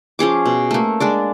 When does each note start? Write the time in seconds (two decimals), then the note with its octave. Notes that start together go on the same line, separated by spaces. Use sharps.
0.19 F3 C#4 G#4 D6
0.46 B2
0.71 A3 A#3
1.00 G#3 D4 D5